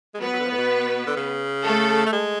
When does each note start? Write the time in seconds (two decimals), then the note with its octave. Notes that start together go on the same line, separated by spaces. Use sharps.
0.14 G#3
0.21 F#3 B3 B4
0.33 F#3
0.40 D3
0.45 F3
0.51 A2
0.57 B2
1.07 D3
1.17 C#3
1.65 A3 A4
2.06 A3
2.12 G#3